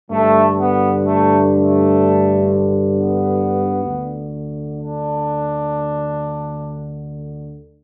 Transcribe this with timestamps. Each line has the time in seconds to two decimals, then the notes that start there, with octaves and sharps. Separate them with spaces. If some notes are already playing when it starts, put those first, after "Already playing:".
0.10 G2 D3 A3
0.57 B3
1.04 A3
1.51 A3
2.91 B3
3.85 D2 D3
4.79 D4